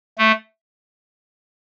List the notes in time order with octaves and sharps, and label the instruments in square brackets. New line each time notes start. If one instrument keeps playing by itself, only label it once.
[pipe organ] A3